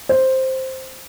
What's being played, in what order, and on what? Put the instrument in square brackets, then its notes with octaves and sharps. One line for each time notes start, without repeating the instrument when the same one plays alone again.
[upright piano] C5